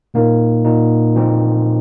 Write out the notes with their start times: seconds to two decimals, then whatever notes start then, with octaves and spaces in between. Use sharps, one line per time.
0.14 A#2 A#3 D#4
0.65 A#2 A#3 D#4
1.15 A#2 F3 C4 D#4